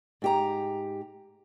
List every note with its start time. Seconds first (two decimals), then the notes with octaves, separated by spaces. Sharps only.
0.22 G#2 G4 A#5